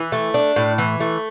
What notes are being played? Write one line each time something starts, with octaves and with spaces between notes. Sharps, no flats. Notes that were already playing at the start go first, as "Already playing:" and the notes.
Already playing: E3
A3
D4
A2
E3
A3